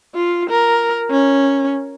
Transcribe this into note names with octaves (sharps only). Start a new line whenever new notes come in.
F4
A#4
C#4